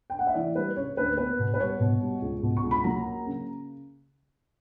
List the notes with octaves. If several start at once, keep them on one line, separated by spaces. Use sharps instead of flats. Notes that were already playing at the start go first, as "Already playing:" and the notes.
G5
F#5
E5
E3 D5
G3 B4
C#3 C#5
D2 B4
B3 B4
B2
B4
G3 C#5
B2
G3
C#2
B2
C#6
C#2
B5
F#3 A#5
A#3
C#3